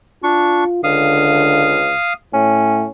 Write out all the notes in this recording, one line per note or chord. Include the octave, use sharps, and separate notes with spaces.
D4 F4 C#6
C#2 D3 F5 D#6
A2 C#4